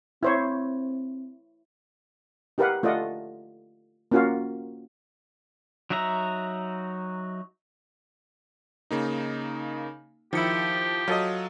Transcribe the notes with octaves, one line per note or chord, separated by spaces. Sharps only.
C4 E4 C5 C#5
D#4 G4 A#4 B4 F5 F#5
A3 F4 D5 D#5 F#5
A#3 C#4 F4 F#4 A#4 F5
F#3 D#4 F#4 E5 A#5
C#3 A#3 D#4
D#3 F3 E4 G4 C#7
F#3 F4 A4 D#5